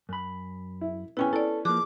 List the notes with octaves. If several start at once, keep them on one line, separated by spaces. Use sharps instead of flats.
F#2 B5
E4
B3 C#4 E4 G5 G#5
E4 A4 D5
F3 A#3 G#4 D6 F#6